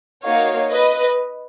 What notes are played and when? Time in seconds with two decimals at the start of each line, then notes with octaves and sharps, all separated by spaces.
0.23 A#3 D#4 F#4 C#5 F5
0.71 B4 D#5